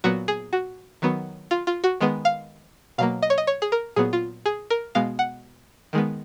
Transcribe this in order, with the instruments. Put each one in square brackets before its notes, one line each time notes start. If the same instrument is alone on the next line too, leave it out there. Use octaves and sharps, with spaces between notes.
[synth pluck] A#2 F#3 B3 F#4
G#4
F#4
D#3 F#3 B3
F4
F4
F#4
D#3 G#3 B3
F5
B2 F#3 A#3 F5
D#5
C#5
D#5
C#5
G#4
A#4
A#2 F#3 B3 G#4
F4
G#4
A#4
B2 G#3 B3 F5
F#5
D#3 G#3 B3